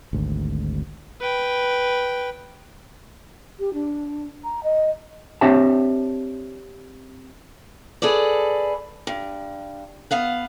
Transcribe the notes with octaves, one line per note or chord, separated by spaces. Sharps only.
G#1 D2
B4 G5
G4
D4
A#5
D#5
C4 D4 G4 C#5 E5 A5
G#4 A4 B4 D5
G2
B3 F5 F#5